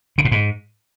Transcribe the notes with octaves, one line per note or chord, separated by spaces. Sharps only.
C#3
A2
G#2